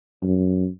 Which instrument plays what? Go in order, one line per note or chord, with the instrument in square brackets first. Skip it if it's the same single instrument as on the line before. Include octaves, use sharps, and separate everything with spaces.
[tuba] F#2